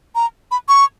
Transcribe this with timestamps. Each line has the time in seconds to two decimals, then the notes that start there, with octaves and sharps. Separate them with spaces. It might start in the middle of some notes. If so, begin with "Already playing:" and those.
0.15 A#5
0.51 B5
0.69 C#6